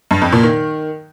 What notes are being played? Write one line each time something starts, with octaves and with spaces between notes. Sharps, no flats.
G2
F2
A#2
D#3